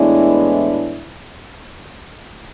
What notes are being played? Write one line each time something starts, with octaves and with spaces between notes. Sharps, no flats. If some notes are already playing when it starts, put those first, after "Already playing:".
Already playing: A2 E3 G#3 B3 D4 E4